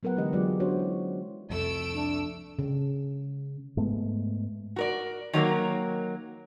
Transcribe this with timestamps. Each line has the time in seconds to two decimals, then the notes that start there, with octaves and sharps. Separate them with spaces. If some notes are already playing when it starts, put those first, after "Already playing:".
0.03 F#3 B3 A#4 B4 F#5
0.17 D3 E3 G#3 D#4 G4 D#5
0.33 F#3 G#3 F4 G#4 D5
0.60 C#4 D4 F#4 C5 C#5
0.79 E4
1.50 C2 F2 A3 E6 D7
1.94 D4
2.59 C#3
3.77 G#2 G#3 A3 B3
4.76 F#4 A#4 D5
5.33 D#3 F#3 A#3 A#4